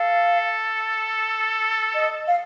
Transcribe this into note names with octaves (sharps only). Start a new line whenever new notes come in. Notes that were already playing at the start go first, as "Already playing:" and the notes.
Already playing: A4 F5
D#5
F5